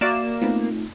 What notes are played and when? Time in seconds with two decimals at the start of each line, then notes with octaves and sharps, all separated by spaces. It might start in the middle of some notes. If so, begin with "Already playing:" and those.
0.01 A#3 F#4 D5 E5 A6 D#7 E7
0.42 A3 B3 C4 D#4 F4 B4